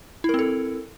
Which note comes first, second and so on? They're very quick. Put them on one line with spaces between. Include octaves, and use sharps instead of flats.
E4 A#4 C4 A4